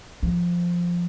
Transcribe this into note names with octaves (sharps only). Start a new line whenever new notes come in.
F3